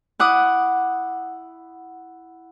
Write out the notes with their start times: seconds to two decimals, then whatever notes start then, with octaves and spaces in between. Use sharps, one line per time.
0.19 E4 F#5 D6 D#6